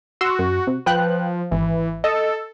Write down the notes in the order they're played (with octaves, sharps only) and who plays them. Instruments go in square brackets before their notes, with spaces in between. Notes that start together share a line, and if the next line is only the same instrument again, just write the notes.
[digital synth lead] F#4 [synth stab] C6 E6
[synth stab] F#2
C3
[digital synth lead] F3 [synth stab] B4 G5 F#6
[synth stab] G#1 [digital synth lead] E3
[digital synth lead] A4 [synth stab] D#5